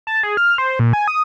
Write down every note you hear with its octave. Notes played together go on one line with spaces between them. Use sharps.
A5
G#4
F6
C5
A#2
G#5
D#6